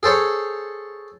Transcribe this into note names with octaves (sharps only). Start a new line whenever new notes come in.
G#4 A4 C5 C#5